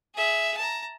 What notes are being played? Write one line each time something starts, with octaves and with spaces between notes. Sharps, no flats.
G#4 E5
A5 A#5